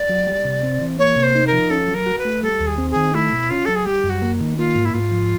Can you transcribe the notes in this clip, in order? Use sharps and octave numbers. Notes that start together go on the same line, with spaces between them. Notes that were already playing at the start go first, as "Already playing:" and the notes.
Already playing: D5
F#3
G3
C3
C4
E3
A#3 C#5
C3
C5
D#4
A#4
F3
C#4 A4
F#3
A#4
F#4
B4
A3
G3 A4
D#2
G#4
C4
G#4
D#3
A3 E4
B2
C#4 F4
F#3 A4
G#4
G3 G4
F#2
F#4
A#3
D#3
A#3 F4
G#2
E4
G#2 F4
F3